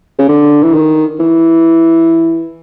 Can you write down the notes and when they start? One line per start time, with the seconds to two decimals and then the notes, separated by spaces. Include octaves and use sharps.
0.19 C#3
0.29 D3
0.63 E3
0.74 D#3
1.19 E3